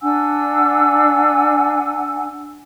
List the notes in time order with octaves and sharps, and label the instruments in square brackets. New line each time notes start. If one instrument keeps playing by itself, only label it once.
[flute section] D4 F#5 G#5 E6